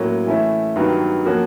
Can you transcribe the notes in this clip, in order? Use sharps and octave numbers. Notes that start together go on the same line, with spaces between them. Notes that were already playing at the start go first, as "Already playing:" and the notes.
Already playing: A2 F#3 A#3 C#4
E3 A3 C#4 E4
G2 D#3 F#3 B3
F3 A#3 C#4 F#4